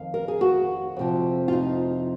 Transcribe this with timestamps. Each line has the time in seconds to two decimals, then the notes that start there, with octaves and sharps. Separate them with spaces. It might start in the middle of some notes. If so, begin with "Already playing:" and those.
Already playing: F2 D#3 F5
0.14 A#4
0.28 G#4
0.41 F#4
0.97 F2 C3 F3
1.48 F4
1.53 D#4